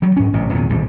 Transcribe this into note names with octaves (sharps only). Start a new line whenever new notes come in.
F#3 G3
G#2 C#4
A1 A2 C3
E2 A#2 D#3
D#1 C2 B2 D3